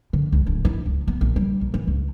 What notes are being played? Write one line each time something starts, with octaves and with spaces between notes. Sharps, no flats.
D3
C#2
D1
E4
C#2
B3
A#1
G3
A#1
E3
C#2